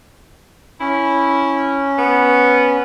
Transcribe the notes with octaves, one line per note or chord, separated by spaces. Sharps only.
C#4 E4
B3